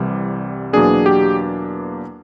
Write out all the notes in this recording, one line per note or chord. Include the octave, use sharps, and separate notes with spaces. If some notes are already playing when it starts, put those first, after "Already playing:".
Already playing: C2 C3 E3 G3
E2 B2 F#3 A#3 D4 G#4
G4